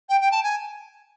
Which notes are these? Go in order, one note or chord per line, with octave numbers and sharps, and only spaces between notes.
G5
G5
A5
G#5